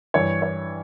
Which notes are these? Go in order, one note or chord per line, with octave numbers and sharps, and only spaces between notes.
G2 E3 C#5
C#5